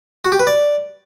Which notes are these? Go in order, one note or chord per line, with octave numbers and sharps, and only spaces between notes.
F#4
G4
B4
D5